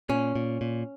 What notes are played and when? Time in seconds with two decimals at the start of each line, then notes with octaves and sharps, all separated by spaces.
0.09 A#2 C#4
0.35 A#2
0.61 A#2